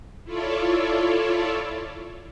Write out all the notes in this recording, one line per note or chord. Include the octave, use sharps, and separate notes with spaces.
E4 F4 A4 C#5 D5